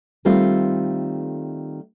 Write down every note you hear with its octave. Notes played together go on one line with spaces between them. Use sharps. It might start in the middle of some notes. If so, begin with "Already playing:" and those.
D#3 G3 A3 C4 F4